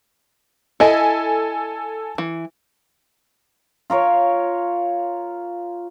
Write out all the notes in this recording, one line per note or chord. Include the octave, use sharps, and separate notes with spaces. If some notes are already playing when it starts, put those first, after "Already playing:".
E4 A4 D#5 G#5
E3
F4 A#4 C#5